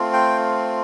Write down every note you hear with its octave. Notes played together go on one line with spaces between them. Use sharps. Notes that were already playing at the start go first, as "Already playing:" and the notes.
Already playing: A3 C4 F4
G5